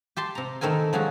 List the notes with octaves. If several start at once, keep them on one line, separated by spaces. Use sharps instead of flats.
G4 A5 C6
C3 A#5
D#3 A3 C4 A#4 G#5
F3 F#3 G#3 F#4